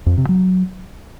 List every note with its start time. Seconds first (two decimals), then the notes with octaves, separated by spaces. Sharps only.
0.06 F2
0.18 C3
0.29 F#3